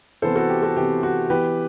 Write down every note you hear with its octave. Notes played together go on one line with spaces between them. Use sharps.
C3 E3 B3 A4 C5
F#4 A4
G4
F#4 A4
C3 E3 B3 G4
F#4
E3 B3 G4 B4